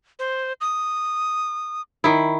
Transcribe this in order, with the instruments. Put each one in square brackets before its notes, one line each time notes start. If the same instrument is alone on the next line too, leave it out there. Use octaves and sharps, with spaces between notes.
[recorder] C5
D#6
[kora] D#3 E4